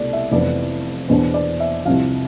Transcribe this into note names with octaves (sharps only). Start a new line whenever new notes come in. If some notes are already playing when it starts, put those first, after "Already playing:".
Already playing: C2 B2 A3 D5
E5
F1 F2 E3 B3 D5
E2 B2 B3 D4 C5
D5
E5
C2 C3 F3 F5